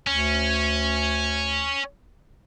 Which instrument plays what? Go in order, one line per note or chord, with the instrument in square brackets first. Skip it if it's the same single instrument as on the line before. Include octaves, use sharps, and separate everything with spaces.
[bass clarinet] D2 [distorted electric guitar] C#4